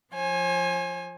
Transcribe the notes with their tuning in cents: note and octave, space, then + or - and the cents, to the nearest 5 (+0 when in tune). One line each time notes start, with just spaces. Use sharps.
F3 +0 C5 +45 G#5 +0